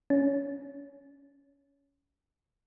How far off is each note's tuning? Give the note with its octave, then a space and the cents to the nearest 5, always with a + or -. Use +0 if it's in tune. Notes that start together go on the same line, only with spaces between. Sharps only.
C#4 +15